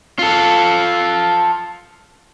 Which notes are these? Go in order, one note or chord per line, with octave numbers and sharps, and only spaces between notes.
F4 A4